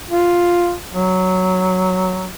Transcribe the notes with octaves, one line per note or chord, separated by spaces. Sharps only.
F4
F#3